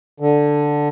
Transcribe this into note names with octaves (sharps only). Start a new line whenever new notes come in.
D3